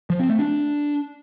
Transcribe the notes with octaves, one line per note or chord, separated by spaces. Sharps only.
F3
C4
A3
D4